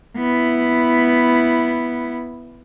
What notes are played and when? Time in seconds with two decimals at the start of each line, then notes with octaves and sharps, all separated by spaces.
0.17 B3 E4